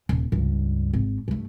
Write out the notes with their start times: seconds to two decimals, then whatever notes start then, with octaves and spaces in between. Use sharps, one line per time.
0.09 D#1
0.32 C#2 G2
0.93 G#1
1.28 G2 A3